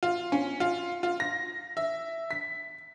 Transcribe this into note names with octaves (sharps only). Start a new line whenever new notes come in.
F4
C#4
F4
F4
A#6
E5
B6